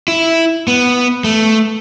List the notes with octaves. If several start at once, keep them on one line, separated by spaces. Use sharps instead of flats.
E4
B3
A3